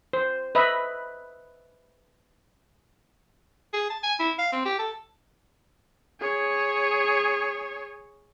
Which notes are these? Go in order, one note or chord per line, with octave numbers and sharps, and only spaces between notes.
C5
B4 D#5 E5 B5
G#4
A5
G#5
E4
F5
C4
G4
A4
G#4 C#5